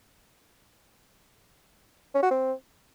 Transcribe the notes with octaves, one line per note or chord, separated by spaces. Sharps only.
C#4
F#4
C4